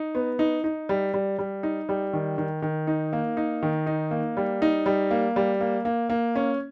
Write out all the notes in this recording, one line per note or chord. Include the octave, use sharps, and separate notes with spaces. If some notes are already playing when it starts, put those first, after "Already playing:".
Already playing: D#4
B3
D#4
D#4
G3
G3
G3
D#4
G3
D#3
D#3
D#3
D#4
A#3
D#4
D#3
D#4
A#3
G3
D#4
G3
A#3
G3
A#3
A#3
A#3
C#4